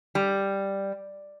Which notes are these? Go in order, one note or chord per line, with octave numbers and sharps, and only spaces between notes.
G3